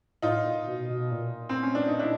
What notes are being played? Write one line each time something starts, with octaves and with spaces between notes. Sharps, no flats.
A2 D#4 F4
A#2
B2
B2
A#2
C4
C#4
D4
D#4
D4 E4